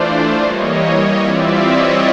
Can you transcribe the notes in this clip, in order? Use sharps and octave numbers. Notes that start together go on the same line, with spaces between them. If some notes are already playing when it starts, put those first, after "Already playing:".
Already playing: E3 A3 D4 F4 C5 D5
E3 G3 A#3 C#5 D#5
E3 G3 C4 F4 D5 E5
C#5 D#5